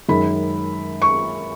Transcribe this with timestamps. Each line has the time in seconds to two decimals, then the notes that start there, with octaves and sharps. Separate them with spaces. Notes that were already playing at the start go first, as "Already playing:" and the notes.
0.09 F#2 D#3 G#3 B5
1.02 C#6